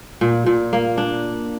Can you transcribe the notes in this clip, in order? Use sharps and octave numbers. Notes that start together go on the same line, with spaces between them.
A#2
A#2
A#3
D4